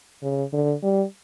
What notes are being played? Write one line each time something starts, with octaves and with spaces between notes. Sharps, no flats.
C#3
D3
G3